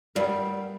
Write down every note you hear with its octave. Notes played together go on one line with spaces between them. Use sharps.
G2 G3 B3 E4 A#4